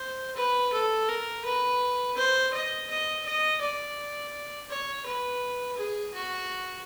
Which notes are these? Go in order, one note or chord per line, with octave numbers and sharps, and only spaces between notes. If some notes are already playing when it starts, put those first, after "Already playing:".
Already playing: C5
B4
A4
A#4
B4
C5
D#5
D#5
D#5
D5
C#5
B4
G#4
F#4